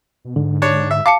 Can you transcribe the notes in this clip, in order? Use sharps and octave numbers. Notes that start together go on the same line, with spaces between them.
B2
G#2 D3
D4 C#5
E5
F5 A5 D6 C#7